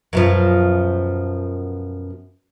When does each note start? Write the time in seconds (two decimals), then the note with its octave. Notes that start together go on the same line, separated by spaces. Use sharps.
0.13 F#2 B2 F3